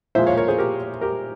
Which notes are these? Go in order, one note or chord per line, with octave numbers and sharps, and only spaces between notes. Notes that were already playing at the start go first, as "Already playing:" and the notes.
A#2 F3 G#3 C5 E5
C#5 F5
A#4 C#5
G#4 C5
G4 A#4
G4 A#4